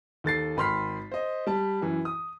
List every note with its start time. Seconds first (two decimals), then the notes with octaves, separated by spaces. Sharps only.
0.24 D#2 A4 A6 C7
0.57 G#1 B5 C6 F6 B6 C7
1.11 C5 D#5
1.47 G3 A5
1.82 F#2 E3
2.05 D#6